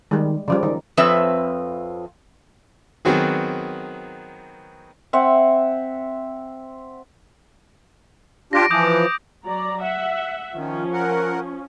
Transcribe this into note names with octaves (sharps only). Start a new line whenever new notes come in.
D#3 G3 G#3
C#3 F3 G3 D5
D#3
F2 F3 C4 B4 C#5 E5
D#3 F#3 B3 C4 F#4 G#4
C4 E5 F#5
D4 F4 G4 A#6 D7
E3 F3 D6 D#6 G6
F#3 D5 A#5
E5 F#5
D#3 F3 C#4
A#4 F#5